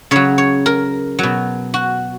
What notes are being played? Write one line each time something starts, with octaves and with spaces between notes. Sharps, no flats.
C#3 F#3 C#5
C#5
A#4
B2 F#3
F#4